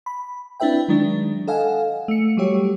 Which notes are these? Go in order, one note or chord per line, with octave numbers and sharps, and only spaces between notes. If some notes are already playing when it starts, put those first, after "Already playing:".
B5
C4 D4 E4 B4 E5 G5
D#3 F#3 G#3 D4 D#4
A4 D#5 F5 F#5 G#5
A3 C#7
F#3 G3 A3 F#4 G4 C#5